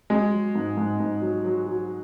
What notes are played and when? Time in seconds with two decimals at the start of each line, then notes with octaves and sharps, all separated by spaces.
0.10 F#3 G#3
0.33 F#3
0.55 G#2
0.77 G#2
1.00 G#2
1.21 F#3
1.45 F#3
1.67 F#3